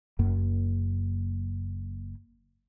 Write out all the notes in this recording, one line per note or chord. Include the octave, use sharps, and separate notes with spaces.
F#1 F#2 A#3